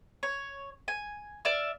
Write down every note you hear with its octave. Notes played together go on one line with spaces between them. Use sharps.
C#5
G#5
D5 E5 F6